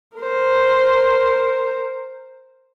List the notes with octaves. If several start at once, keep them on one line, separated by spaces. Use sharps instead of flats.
A#4 C5